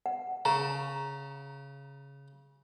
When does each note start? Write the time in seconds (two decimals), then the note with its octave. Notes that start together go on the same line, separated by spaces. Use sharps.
0.06 F#5
0.45 C#3 A#5